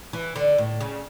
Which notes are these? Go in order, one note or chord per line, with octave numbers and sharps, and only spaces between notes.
E3
D3
A2
C#3